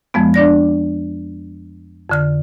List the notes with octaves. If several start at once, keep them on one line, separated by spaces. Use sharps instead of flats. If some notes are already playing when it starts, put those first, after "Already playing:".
F2 F3 G#3 B3
D4 D5 A#6
F2 D3 F6